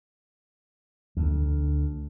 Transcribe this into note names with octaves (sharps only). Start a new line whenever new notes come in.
D2